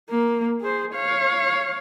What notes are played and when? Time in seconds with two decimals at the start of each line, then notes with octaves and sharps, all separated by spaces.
0.10 A#3
0.61 G#4 C5
0.93 C#5 F5